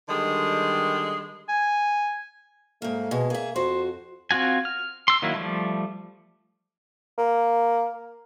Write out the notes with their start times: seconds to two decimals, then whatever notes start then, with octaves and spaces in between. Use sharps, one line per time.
0.09 D3 D#3 G3 G#3
1.49 G#5
2.82 G#2 A3 A#3
3.11 B2 G#3
3.30 A#3 G#4 E5
3.56 F2 F#4 C5
4.31 C4 F4 F#4 G#5
4.65 F6
5.08 C6 E6
5.22 D#3 F#3 A#3 E4
5.35 F3 G3 A3
7.18 A#3